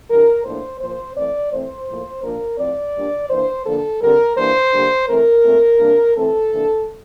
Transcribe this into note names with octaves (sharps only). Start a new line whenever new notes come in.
E3 G3 D4 A#4
A2 F3 A#3 D4 C5
A#2 F3 A#3 C5
E3 A3 C4 D5
E3 A3 C4 C5
A2 F3 A#3
A#2 F3 A#3 D4 A#4
A2 F3 C4 D5
A#2 G3 D4
E3 A#3 D4 C5
D3 F3 A#3 D4 A4
D3 G3 C4 A#4
E3 G3 A#3 D4 C5
D3 G3 A#3 D4
E3 A3 C4 A#4
A#2 A3 C4
C3 G3 A#3 D4
E3 A3 C4 A4
C3 E3 A#3 D4